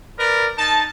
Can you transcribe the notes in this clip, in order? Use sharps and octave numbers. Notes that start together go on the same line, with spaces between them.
A#4 B4 D5
D#4 A5